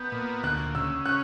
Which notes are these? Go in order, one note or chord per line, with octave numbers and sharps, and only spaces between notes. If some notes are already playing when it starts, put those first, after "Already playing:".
Already playing: B3 G6
A#2
D2 F#6
C#3 E6
C#4 F#6